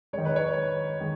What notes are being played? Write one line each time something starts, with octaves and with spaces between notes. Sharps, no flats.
D#3 G#3 C#5
B4
C#5
D#3 G#3